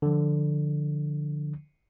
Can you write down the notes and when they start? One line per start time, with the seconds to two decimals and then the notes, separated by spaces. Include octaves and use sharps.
0.02 D3 F3